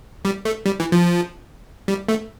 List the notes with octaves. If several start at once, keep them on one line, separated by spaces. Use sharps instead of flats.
G3
A3
G3
E3
F3
G3
A3